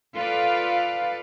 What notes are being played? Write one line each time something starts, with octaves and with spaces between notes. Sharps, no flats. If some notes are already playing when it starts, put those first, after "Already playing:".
F4 A4 B4 D5 F5